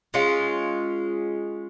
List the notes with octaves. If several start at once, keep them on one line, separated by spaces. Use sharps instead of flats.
G#3 C#4 F4